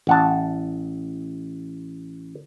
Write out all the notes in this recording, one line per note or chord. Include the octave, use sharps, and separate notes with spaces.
A1 F#5 A5